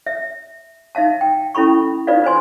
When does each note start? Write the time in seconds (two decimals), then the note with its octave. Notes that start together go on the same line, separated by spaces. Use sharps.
0.06 E5
0.95 D#4 E5 F5 A5
1.21 G5
1.55 C#4 E4 A4 B5 C#6
2.07 D#4 F4 B4 D5 F5
2.24 B4 C5 G#5 C6